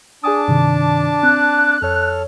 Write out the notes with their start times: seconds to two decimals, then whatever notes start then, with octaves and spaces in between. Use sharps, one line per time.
0.24 D4 G#4 G#5 A5 D6 D#6
0.48 G2 C3 D#3
1.23 C4 F#6
1.82 F2 A4 C#5 F6